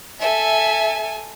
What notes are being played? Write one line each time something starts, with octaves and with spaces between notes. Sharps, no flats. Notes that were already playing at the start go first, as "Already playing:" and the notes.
A4 E5 G#5